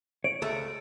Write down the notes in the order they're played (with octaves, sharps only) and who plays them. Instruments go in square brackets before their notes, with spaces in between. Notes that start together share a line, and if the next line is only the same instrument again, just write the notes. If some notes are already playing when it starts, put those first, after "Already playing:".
[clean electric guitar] C#5 [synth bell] D7
[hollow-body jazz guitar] C#2 G#3 A3